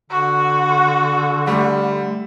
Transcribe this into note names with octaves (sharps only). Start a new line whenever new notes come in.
D3 F#4
G3 A3